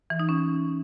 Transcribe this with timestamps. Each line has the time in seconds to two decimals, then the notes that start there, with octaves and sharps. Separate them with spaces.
0.10 E3
0.20 D#4
0.29 C#4